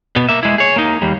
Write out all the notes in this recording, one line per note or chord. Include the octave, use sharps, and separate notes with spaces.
B2 B3
A#3 E5
G#3 E4
G#4 C#5
A#3 D#4
D#2 G3